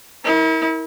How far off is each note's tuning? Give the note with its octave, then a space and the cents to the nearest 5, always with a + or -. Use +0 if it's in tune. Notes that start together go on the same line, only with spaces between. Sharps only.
E4 -40 A#4 +0